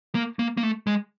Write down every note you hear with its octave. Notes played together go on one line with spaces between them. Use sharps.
A#3
A#3
A#3
A3
G#3